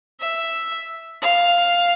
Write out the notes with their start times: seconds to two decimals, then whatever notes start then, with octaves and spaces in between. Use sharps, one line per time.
0.21 E5
1.22 F5